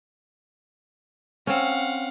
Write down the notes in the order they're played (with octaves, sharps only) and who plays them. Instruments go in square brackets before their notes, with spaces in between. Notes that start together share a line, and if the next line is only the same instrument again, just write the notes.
[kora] C4 C#4 [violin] F5 F#5